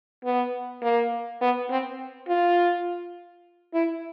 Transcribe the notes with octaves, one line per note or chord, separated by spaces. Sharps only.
B3
A#3
B3
C4
F4
E4